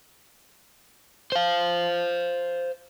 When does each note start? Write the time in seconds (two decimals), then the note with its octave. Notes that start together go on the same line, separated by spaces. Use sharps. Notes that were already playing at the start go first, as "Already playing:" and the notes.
1.32 C5 F5